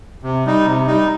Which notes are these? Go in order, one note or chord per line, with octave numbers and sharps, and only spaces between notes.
C3
G3 D#4
C3
G3 D#4